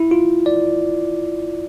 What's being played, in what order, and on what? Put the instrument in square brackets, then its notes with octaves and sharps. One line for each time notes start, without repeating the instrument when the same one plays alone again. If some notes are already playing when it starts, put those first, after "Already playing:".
Already playing: [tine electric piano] E4
F4
D5